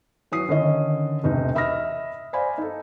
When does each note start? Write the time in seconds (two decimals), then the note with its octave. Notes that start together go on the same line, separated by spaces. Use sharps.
0.32 E3 F#3 D#6 C7
0.49 D3 D#3 C#4 D#5
1.24 E1 C3 D#4
1.55 D#5 E5 B5 D#6 F6 A#6
2.33 C5 D5 F5 G#5 B5
2.57 D#4 A4